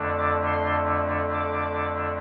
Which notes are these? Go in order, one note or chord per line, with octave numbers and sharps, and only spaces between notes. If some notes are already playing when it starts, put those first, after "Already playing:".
Already playing: F2 D3 A3 D4
D6
C6
D6